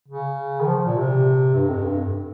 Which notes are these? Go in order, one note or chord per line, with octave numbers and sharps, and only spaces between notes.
C#3
D#3
F3
A#2
C3
G2
F2
G2